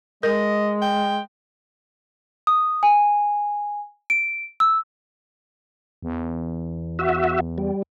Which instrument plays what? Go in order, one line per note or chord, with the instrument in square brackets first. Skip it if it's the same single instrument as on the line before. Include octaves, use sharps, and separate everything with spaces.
[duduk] G#3 [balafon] A#4 [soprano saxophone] D#5
[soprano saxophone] G5
[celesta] D#6
G#5
D7
E6
[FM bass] E2
[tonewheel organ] F#4 E5
G3